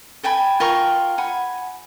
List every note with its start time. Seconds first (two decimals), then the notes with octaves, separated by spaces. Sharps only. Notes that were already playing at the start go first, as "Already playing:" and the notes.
0.23 A4 G5 G#5 B5
0.60 F4 A#4 G5 C#6
1.18 F#5 G#5 B5